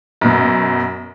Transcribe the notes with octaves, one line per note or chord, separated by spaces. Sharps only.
F#2 B2